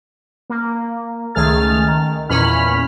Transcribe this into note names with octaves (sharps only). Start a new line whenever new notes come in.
A#3
C#2 D#3 A3 G#4 F6 A6
D#3
E2 A#2 C#4 B5 F6